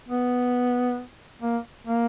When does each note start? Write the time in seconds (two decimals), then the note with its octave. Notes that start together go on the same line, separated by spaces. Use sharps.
0.09 B3
1.42 A#3
1.87 A#3